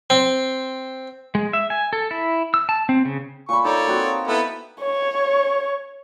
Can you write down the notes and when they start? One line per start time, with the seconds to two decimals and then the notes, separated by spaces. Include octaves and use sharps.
0.10 C4
1.35 G#3
1.53 E5
1.70 G#5
1.93 A4
2.11 E4
2.54 E6
2.69 A5
2.89 C4
3.05 C#3
3.49 A#2 D5 B5 C#6
3.65 D#4 A4 C#5 D5
3.87 A#3 C4 F#4
4.28 B3 E4 A4 B5 D6
4.81 C#5